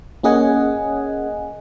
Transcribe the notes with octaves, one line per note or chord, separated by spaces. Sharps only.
A#3 C#4 G#4 D#5 F#5 G#5